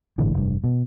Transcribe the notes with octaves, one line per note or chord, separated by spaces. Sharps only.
G1 A2 D3 E3
F1 G2
B2